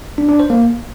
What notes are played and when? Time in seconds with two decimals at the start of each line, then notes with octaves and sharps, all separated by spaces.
0.18 D4
0.29 D4
0.39 C5
0.50 A#3